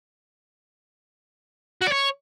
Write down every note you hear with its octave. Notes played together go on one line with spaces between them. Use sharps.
F#4
D5
C#5